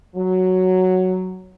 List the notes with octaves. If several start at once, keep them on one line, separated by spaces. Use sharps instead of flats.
F#3